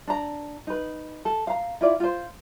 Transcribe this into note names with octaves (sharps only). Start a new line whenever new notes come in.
D4 A#5
D#4 B4
A4
F5 A#5
E4 F4 D5
F4 C5